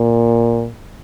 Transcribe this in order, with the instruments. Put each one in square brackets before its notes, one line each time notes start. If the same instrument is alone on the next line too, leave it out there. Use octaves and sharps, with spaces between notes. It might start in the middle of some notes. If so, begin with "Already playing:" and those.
Already playing: [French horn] A#2